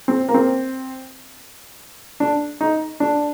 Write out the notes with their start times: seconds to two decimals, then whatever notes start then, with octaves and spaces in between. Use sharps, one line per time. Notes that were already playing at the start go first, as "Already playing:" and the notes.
0.08 C4
0.28 A#3
0.34 C4
2.20 D4
2.61 D#4
3.00 D4